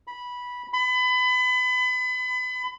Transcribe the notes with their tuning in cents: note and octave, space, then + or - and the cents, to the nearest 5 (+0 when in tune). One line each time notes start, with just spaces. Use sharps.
B5 -10
B5 +30